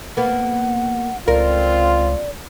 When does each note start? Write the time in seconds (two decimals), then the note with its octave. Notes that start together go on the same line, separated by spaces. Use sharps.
0.17 A#3 B3 F#5
1.28 C#2 C4 F4 A#4 D5